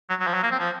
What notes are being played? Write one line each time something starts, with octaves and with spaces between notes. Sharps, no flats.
F#3
F#3
F3
F#3
A#3
C4
F3